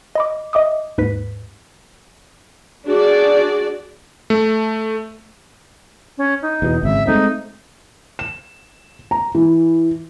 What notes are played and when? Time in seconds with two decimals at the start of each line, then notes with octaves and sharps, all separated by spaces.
0.15 D#5 B5 D6
0.53 D#5 E5 D6 D#6
0.98 D#2 G#2 B4 B6
2.86 D4 F#4 G#4 D5
4.30 A3
6.18 C#4
6.42 D#4
6.62 E2 B2
6.83 G#1 C#3 E5
7.07 G#3 A3 C4 D#4
8.19 E7
9.11 A#5
9.35 E3